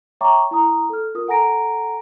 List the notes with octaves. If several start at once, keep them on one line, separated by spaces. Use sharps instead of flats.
C#5 E5 G5 A#5 C#6 D6
E4 A#5 D#6
A4 F6
F4 A#4 D#6
A4 F#5 G#5 A#5 A#6 D7